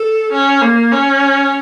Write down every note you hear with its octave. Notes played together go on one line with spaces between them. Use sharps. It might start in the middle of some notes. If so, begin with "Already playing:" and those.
Already playing: A4
C#4
A#3
C#4